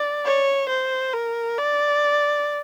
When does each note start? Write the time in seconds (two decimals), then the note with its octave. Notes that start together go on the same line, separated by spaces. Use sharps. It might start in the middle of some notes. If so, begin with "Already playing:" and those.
Already playing: D5
0.25 C#5
0.69 C5
1.13 A#4
1.57 D5